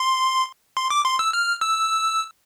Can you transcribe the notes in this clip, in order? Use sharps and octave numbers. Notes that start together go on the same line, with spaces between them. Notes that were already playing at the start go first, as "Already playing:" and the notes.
Already playing: C6
C6
D6
C6
E6
F6
E6